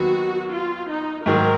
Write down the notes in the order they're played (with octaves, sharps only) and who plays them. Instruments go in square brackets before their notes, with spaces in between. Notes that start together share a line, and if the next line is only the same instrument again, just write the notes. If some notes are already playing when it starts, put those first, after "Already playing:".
Already playing: [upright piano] D#2 D#3 F#3 B3 [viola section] F#4
[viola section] F4
D#4
[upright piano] G#2 D#3 F#3 [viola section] A#4